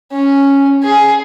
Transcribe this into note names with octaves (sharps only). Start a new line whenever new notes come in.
C#4
G#4